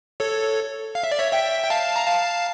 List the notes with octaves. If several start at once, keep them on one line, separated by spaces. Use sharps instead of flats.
A4 C#5
F5
E5
D5
C#5 E5
E5 G5
G5
F5 A5
A#5
F5 A5